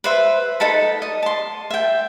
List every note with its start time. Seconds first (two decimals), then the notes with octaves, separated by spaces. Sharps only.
0.04 B4 C5 E5
0.60 D#4 A4 A5 B5
1.02 D#5
1.23 A5 C6
1.70 E5 G5